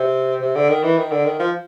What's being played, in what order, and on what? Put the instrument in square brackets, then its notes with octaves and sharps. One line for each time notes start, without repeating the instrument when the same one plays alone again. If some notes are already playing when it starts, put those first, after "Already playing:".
Already playing: [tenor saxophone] C3
C3
D3
D#3
E3
D#3
D3
D#3
F3